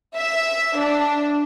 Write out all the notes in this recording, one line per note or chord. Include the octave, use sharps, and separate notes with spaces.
E5
D4